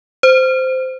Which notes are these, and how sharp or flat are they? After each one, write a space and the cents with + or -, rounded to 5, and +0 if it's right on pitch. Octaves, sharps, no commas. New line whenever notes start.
C5 -15